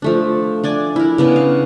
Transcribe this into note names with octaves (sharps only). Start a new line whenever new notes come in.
F3 A3 D4
D4 D5 G#5
E4 A#4
C#3 B3 D4 A5
F5